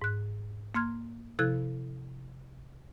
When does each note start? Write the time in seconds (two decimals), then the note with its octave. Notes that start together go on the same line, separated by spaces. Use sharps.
0.02 G#2 F#6
0.75 A#3 C6 F6 G#6
1.39 C3 F3 E4 A4 F#6 G#6